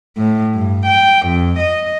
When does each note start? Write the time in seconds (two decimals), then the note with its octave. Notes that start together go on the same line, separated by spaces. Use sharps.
0.18 A2
0.57 G2
0.87 G5
1.27 F2
1.61 D#5